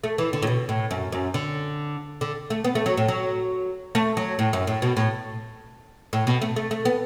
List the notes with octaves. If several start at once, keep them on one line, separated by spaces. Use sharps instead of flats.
A3
E3
D3
A2
B2
A2
F#2
F#2
D3
D3
A3
B3
A3
F#3
A2
F#3
A3
F#3
A2
F#2
A2
B2
A2
A2
B2
A3
A3
A3
B3